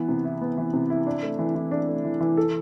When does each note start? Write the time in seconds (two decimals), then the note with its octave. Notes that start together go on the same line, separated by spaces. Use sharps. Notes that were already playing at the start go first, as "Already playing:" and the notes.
Already playing: E3 B3
0.09 C3
0.25 E4
0.41 B3
0.58 E3
0.73 C3
0.90 E4
1.07 D4
1.23 A3
1.39 E3
1.55 E3
1.71 D4
1.89 A3
2.05 E3
2.20 E3
2.37 A4